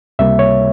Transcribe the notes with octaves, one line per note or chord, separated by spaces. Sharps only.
C#2 C3 G3 A#3 E5
C#5